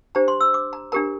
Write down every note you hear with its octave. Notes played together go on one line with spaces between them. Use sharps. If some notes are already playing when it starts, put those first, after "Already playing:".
D4 G4 C5 A#5
C6
E6
D6
A#5
D4 G4 A#4 A#5